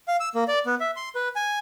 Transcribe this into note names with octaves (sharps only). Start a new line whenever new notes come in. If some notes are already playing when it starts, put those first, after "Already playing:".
F5
E6
A#3
D5
B3
E5
C6
B4
G#5